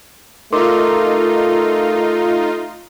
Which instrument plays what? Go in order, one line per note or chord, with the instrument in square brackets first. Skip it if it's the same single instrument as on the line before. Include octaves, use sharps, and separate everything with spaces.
[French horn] A3 [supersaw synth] D#4 F4 [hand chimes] A#4 C6 D6